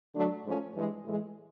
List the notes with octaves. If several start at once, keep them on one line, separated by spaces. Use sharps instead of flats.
D3 F#3 A3 D4
G#2 F3 A3 C#4
G2 E3 G#3
A2 E3 G#3